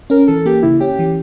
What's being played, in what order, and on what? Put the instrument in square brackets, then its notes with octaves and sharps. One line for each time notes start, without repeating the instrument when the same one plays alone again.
[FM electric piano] C#4 [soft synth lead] A#4
[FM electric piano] E3 [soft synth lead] A4
[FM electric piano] A#3 [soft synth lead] G4
[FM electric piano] C#3 [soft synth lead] E4
[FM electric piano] C#4 [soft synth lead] G4
[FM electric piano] E3